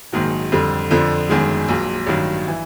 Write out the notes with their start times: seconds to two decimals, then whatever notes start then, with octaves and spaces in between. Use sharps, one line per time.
0.12 A#1 G#2 D#3 F#3
0.52 F2 D3 G3
0.91 F2 D3 F3
1.29 G1 F#2 D#3 G#3
1.68 A#1 A#2 F#3
2.07 A1 G2 D#3 F#3
2.48 E3